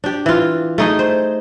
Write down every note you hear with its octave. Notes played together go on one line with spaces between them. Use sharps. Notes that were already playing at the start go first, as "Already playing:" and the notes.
D4 G4
E3 F4
A3 D#4 G#4
C5